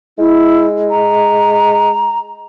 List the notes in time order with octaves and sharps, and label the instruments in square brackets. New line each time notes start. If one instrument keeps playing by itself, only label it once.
[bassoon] G#3 [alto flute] E4
[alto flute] A#5